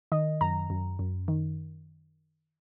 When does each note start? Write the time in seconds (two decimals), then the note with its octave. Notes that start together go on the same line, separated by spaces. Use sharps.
0.12 D#3 D#5
0.41 F#2 A#5
0.70 F#2
0.99 F#2
1.28 D#3